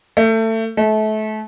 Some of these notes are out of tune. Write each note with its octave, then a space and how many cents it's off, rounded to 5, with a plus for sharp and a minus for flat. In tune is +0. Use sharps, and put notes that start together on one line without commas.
A3 +25
A3 -30